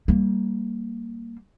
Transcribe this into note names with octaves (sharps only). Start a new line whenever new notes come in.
G3 A#3